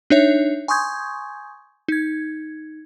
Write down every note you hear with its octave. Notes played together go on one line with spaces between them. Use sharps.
D4 D#4 C#5 E5
G#5 C6 C#6 D#6 G6 G#6
D#4 G#6